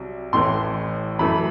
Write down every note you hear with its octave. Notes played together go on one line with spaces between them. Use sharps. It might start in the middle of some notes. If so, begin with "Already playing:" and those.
Already playing: C2 C3 F#3
A1 A2 E3 C6
F#2 E3 A3 B5